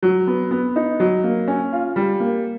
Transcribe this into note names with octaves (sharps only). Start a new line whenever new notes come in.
F#3
B3
B3
D#4
F#3
A#3
C#4
F4
G3
A#3